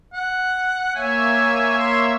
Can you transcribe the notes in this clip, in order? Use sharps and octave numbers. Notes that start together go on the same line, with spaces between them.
F#5
A#3 C#5 E5 G#5
C6